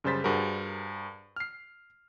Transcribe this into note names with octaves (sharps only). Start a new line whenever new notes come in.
F#2 C#3 G3 C5 A6 B6
G2 F#4 G#4 A#4 C5
F6 C7